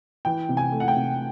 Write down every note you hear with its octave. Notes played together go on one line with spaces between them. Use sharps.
E3 G5
C3
G#5
A3
F#5
G5
C3